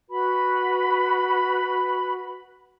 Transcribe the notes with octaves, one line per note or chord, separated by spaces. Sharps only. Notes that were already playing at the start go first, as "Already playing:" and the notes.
F#4 B4 B5